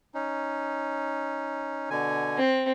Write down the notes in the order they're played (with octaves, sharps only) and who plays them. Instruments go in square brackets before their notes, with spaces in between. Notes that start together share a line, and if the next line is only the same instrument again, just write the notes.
[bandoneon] C#4 D#4
B2 D3 G#5
[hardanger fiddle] C4